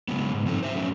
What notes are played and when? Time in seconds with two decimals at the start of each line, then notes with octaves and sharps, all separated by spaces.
0.08 C#3 F#3 G#3 B3
0.34 G#2
0.46 F3 C4 D#4 A4
0.63 C5 E5
0.75 F#3 A3 C#4